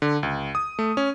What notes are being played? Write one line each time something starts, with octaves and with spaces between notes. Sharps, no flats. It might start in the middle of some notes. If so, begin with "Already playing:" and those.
D3
C#2
D#6
A3
C#4